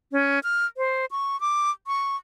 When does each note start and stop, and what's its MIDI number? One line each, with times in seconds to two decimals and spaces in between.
0.12 0.39 61
0.44 0.66 89
0.77 1.06 72
1.11 1.40 85
1.41 1.70 86
1.87 2.16 85